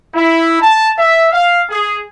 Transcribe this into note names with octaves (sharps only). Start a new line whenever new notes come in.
E4
A5
E5
F5
G#4